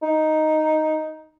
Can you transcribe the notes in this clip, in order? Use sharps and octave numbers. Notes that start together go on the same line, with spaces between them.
D#4